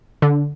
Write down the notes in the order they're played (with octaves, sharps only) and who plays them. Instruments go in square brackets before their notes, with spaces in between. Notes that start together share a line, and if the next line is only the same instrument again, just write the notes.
[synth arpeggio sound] D3